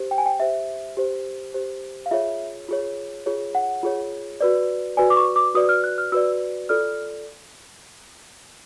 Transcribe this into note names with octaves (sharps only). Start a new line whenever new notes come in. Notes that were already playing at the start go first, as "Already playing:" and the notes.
Already playing: G4 C5
G5
G#5
G5
G4 C5 E5
G4 C5
G4 C5
F5
F4 G#4 C#5 E5
F4 G#4 C#5
F4 G#4 C#5
F#5
F4 G#4 C#5
F#4 B4 D5
F#4 B4 D5 G#5
D6
C#6
D6
F#4 B4 D5 D#6
F6
F#6
F6
F#4 B4 D5 E6
F4 A4 D5 F6